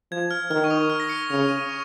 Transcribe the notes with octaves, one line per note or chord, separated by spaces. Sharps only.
F3 G#6
F6
D#3 F6
C#6
D#6
F6
A#6
C#7
C#3 F7
D#7
C#6